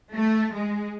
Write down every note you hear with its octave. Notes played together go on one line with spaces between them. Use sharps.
A3
G#3